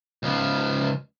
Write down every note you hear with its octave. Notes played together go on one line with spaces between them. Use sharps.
C#2 F3